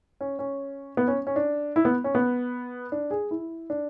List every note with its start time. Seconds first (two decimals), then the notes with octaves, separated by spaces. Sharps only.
0.21 C#4
0.39 C#4
0.97 B3
1.08 C#4
1.27 C#4
1.36 D4
1.76 E4
1.85 B3
2.04 C#4
2.15 B3
2.92 D4
3.11 G#4
3.31 E4
3.70 D4